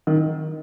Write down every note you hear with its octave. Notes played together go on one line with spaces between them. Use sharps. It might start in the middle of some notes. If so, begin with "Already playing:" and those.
D#3